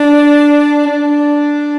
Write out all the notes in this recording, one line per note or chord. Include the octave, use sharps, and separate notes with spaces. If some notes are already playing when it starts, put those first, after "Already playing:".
Already playing: D4
D4